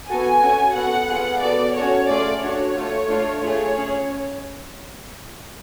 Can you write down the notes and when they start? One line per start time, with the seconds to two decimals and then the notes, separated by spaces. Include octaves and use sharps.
0.09 B3 F#4 A4 G#5
0.42 C#4 F#4 A4
0.75 B3 F#4 A4 F#5
1.08 B3 F4 G#4
1.41 B3 F#4 A4 D5
1.74 C#4 F#4 A4 C#5
2.08 A3 F4 G#4 D5
2.41 D4 F#4 A4 C#5
2.75 A3 F4 A4
3.08 A3 D4 F4
3.41 A3 F4 G#4 C#5
3.75 C#4 G#4